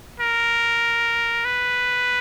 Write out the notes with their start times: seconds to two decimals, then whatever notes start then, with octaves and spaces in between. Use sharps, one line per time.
0.20 A#4
1.45 B4